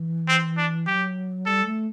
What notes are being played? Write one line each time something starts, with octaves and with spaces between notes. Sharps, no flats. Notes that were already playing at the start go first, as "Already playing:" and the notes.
Already playing: E3
C4
D4
F#3 G4
G3 A4
A3